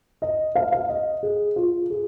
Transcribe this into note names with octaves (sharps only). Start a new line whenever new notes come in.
D#5
F5
F5
D#5
G#4
F4
G#4